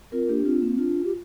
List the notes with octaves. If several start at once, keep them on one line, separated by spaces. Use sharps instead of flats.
C4 F4 A#4
A#3 D4 G4
D4
C4 F4
A#3 C4
D4 F4
G4